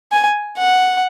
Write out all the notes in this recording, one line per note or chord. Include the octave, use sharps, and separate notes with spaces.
G#5
F#5